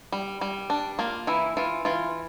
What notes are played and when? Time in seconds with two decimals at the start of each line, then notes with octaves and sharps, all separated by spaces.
0.12 G3
0.41 G3
0.70 D4
0.99 A#3 F4
1.27 E3 E4
1.57 E3 F4
1.85 E3 F4